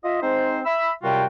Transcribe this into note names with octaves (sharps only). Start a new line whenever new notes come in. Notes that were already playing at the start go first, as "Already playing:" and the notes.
F4 D#5 E5
G#3 C4 D#4 C5
E5 B5 E6
F#2 C3 G3 F4 F#4 G5